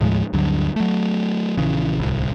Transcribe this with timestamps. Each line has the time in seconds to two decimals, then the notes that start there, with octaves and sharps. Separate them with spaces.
0.01 D#2 A2 F3 G#3
0.33 D2 G2 D3 F#3
0.76 F#3 A3
1.58 A#1 C#3 E3
2.00 D1 C2